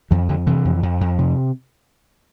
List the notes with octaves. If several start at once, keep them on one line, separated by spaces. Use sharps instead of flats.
F2 E3
F2 D3
C3 E3
F2
F2
F2
C3